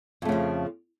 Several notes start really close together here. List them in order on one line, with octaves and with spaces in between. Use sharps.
F2 A3 C#3 F3